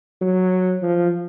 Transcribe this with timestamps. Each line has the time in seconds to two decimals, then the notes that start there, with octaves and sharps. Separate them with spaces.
0.21 F#3
0.82 F3